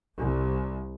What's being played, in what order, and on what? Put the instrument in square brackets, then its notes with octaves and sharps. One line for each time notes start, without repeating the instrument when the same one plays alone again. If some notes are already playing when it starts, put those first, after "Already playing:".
[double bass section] C2